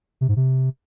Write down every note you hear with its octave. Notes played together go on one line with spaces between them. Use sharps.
C3
G#2
C3